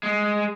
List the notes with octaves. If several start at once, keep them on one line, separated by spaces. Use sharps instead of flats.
G#3